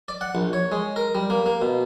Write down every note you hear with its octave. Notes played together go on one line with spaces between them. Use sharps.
D5
F#5
A#1
C#5
G#3
A#4
G3
A#3
A#3
B2